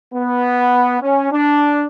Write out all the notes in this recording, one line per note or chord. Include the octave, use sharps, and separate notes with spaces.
B3
C#4
D4